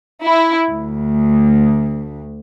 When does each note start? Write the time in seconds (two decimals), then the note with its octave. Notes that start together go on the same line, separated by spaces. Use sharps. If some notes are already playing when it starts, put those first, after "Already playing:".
0.22 E4
0.69 D2